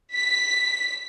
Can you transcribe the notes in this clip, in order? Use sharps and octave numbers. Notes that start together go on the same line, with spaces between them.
B6